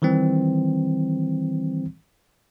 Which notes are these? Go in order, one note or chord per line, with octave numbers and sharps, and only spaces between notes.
D#3 E3 G3 C4